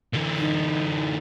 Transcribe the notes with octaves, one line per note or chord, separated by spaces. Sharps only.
D3 E3
D#4